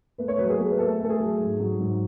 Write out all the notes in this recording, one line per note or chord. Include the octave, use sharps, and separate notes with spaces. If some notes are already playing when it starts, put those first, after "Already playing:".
A3 B4
C#5
F#3 B4
G#4
A3
B4
A3 A4
A3 A4
G#4
F#3
G#2
F#3
G#2